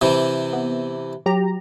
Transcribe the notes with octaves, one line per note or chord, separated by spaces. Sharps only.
C3 E3
B3
F#3 G4 A#5